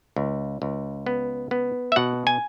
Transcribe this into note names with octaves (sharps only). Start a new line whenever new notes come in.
C#2
C#2
B3
B3
E5
B2 F#5
G#5